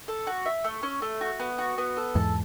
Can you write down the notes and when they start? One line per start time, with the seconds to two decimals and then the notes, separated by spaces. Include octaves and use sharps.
0.08 A4
0.27 F#4
0.46 E5
0.64 A3
0.83 C#4
1.02 A3
1.21 F#4
1.40 B3
1.58 F#4
1.78 B3
1.97 A4
2.15 E2 G#2 A5